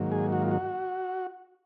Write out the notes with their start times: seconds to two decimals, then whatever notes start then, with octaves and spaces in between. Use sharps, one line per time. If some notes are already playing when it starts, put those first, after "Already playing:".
Already playing: G#2 D#3 F#3 A#3
0.12 G#4
0.32 F#4
0.42 F4
0.51 F#4